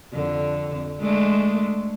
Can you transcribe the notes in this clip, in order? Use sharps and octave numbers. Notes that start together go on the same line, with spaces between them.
F2 D3
G#3 A3 D4